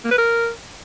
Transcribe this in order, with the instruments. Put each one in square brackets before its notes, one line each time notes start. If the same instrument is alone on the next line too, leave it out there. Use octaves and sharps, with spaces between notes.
[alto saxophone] A#3
B4
A#4